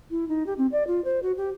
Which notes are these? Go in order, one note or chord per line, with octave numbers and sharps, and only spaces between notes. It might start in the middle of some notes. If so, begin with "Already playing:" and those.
E4
D#4
G4
C4
D5
F4
C5
F#4
G4